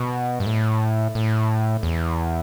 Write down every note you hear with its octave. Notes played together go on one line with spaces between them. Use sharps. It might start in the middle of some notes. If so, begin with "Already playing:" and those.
Already playing: B2
G2
A2
A2
E2